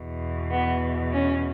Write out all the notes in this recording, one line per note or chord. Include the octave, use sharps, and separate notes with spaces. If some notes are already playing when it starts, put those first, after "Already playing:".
Already playing: E2 B2
B3
C#4